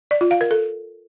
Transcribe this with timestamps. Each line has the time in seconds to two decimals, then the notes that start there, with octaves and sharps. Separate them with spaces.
0.11 D5
0.21 F4
0.31 F5
0.41 A#4
0.51 A4